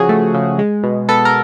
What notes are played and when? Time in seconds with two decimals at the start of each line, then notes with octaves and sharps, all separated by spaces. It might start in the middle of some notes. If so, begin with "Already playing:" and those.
Already playing: C#3 F3 F#4 G#4
0.09 A3
0.34 C#3
0.59 G#3
0.83 B2
1.09 B3 A4
1.25 A#4